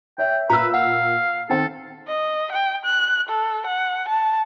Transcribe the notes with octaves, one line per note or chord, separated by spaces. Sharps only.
C#5 E5 G5
A#2 B4 A#5 E6
F5 F#5
D#3 C4 A4 G5
D#5
G5
F#6
A4
F#5
A5